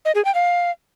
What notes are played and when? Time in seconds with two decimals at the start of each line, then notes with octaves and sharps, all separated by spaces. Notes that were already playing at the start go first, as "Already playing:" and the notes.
0.05 D#5
0.15 G#4
0.25 G5
0.35 F5